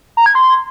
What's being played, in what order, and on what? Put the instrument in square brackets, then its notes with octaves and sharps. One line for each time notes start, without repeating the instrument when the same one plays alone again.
[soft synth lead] A#5
G#6
C6